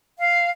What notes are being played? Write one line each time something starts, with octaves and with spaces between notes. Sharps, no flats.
F5